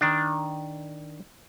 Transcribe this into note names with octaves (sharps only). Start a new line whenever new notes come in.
D#3 D4